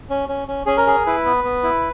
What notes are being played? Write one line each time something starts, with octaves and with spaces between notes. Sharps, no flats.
C#4
C#4
C#4
C#4 G#4
A#4
G#4
E4 B4
B3
B3
E4